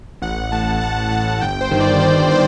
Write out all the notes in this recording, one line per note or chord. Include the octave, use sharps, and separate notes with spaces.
A1 F#5
A2 A5
A1 F#5
A2 F#5
G1 G5
C5
G2 D#3
D5
G1 C5
C5